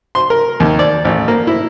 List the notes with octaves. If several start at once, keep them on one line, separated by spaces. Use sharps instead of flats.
C6
A#4
D#2
D5
A1
A#3
E4